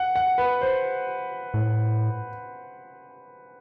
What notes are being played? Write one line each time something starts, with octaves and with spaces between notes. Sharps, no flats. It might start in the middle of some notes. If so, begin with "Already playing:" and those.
Already playing: F#5
F#5
B4
C5
A2